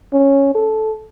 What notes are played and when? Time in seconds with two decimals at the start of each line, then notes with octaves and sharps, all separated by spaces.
0.13 C#4
0.55 A4